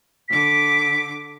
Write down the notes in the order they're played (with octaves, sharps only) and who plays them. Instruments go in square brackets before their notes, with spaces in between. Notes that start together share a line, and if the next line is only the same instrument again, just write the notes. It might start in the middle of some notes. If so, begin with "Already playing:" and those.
[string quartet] D3 D6 [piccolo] B6